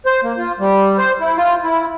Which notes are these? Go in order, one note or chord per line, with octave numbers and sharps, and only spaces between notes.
C5
A#3
F4
G3
C5
E4
F4
E4